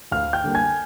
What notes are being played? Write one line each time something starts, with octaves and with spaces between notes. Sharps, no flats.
D2 F5 F6
G5 G6
D3 G3 A#3
G#5 G#6